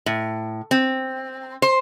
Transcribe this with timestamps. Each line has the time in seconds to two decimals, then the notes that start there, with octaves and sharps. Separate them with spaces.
0.06 A2
0.71 C4
1.62 C5